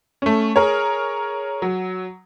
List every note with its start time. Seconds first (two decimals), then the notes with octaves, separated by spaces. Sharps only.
0.22 A3 C#4
0.56 G#4 A#4 C#5
1.62 F#3